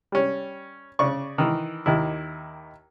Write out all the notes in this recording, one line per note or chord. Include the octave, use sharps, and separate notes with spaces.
G3 C#4
C#3 D5 C#6
D#3 E3
D#2 D#3 E4